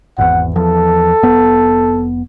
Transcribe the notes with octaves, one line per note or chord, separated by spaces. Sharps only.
G#1 E2 F#5
E2 F3 A4
F1 B3